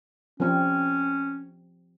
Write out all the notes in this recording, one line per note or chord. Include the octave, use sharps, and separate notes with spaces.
F3 C4 C#4